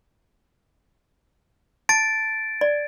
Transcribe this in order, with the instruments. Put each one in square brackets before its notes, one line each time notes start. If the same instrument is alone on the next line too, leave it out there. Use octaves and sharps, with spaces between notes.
[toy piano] A5 [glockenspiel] A6 D7
[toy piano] D5